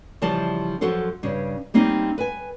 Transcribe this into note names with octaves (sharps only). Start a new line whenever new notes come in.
C#3 E3 F3 G3 A5
F#2 F3 F#4 A4 C5
G2 C#3
G3 A#3 C4 C#4 D#4
B4 G#5